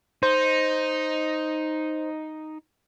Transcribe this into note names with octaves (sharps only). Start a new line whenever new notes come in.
D#4 C5